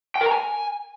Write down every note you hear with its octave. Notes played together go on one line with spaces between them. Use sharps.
G5
A#4
A#5
G#5